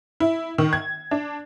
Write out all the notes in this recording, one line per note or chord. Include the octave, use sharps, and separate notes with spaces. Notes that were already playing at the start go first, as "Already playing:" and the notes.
E4
D#3
G#6
D4